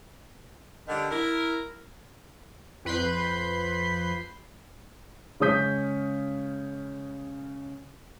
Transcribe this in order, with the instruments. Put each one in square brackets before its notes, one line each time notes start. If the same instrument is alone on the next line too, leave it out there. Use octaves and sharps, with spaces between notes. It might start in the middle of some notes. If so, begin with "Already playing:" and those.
[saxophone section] D3 D#3 G3
E4 A#4
[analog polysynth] F2 B4 B5 C6 G6
[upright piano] C#3 G#3 C#4 D#6 G6 B6